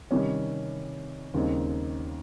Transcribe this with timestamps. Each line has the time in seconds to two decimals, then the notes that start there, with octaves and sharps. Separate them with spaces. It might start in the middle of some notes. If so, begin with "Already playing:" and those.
0.11 C3 D#3 G3 C#4
1.34 D#2 C#3 G3 C4 D#4